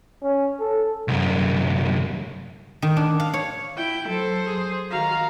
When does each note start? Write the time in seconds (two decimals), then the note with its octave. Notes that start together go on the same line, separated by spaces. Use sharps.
0.22 C#4
0.60 A4
1.08 C2 F#2
2.82 D#3
2.96 D4
3.20 F5
3.34 C#5
3.77 E4 G5
4.08 F#3 A4 C5
4.46 G#4
4.91 D#3 F#4 F5 A#5